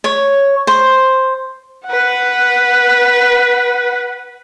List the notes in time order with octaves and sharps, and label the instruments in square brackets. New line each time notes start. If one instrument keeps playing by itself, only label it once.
[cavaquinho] C#5
C5
[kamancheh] B4 F#5